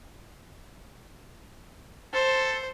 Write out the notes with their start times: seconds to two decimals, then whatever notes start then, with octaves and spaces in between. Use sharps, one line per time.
2.14 A4 C5